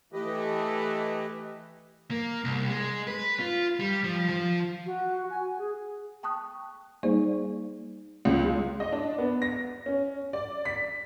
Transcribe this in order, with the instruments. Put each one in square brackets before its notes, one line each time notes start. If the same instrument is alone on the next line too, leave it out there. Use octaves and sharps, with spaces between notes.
[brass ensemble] E3 A3 [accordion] G4 B4 D#5
[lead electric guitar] A#3
C2
G#3
B4
F4
G3
F3
F3
[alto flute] F#4
G#5
G#4
[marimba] G5 A5 C#6 D#6 F#6
G3 A#3 D#4 G#4 C5 D5
[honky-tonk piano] C#2
G#3
D#5
D4
B3
A#6
C#4
D5
B6